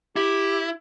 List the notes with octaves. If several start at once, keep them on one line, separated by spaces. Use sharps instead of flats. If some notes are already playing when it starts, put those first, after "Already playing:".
E4 G4